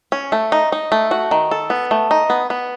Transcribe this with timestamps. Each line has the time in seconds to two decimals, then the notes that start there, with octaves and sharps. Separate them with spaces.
0.12 C#4
0.32 A3
0.52 D#4
0.72 D#4
0.92 A3
1.11 F#4
1.31 D#3
1.51 A4
1.70 B3
1.91 A3
2.11 D#4
2.30 B3
2.50 B3